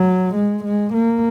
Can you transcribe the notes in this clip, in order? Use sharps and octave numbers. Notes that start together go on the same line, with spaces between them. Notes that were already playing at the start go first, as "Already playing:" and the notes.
Already playing: F#3
G#3
G#3
A#3